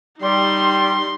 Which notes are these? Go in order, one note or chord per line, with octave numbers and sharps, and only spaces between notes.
G3 D#4 C6